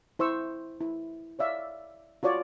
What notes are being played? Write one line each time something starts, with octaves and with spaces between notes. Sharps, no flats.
E4 C5 C#6 E6
E4
C#5 D5 E5 F5
F4 F#4 C#5 D5